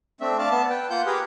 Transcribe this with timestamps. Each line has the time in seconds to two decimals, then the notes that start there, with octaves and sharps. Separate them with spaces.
0.21 A3 C4 D4 E5
0.39 D5 F5 A5
0.51 B3 A5
0.70 B4 G5
0.90 A#3 F4 F#5 G6
1.06 G4 G#4 A#4 B4